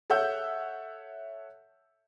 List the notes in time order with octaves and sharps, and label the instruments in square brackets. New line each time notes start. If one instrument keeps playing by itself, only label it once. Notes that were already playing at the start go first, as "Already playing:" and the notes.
[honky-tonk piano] A4 C#5 E5 F#5 E6 G6